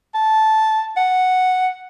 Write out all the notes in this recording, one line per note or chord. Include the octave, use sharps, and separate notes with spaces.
A5
F#5